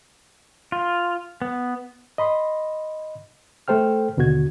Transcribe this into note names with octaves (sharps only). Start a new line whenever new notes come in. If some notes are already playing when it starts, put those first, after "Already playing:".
F4
B3
D#5 B5 C6
A3 A4 C5 G5 F6
D#2 B2 D3 F#4 G#6